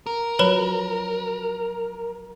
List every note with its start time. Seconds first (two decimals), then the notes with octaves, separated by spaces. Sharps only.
0.06 A#4
0.39 F3 F#3 B4 C#5 B5